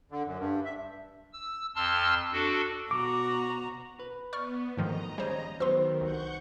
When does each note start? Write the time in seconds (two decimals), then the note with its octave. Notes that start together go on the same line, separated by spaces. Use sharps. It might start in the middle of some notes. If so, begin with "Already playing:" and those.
0.11 D3
0.26 F#2
0.38 G2
0.64 E5
1.33 E6
1.76 F2 A5 C6 E6 F6
2.32 D4 F#4 A4
2.91 B2 F#4 A#5 D6
3.99 B4
4.33 B3 D5 C#6 F6
4.77 D2 G#2 D#3 F3 D#5 A#5
5.18 D#2 G3 C#4 G#4 C5
5.60 D#3 F#3 B3 C5 C6 E6
6.01 C2 F#5 C#6 G6